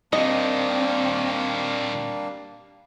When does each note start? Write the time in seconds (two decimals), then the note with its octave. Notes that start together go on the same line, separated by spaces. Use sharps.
0.13 A#2 D#3 G3 A#3 C4 D4 D#5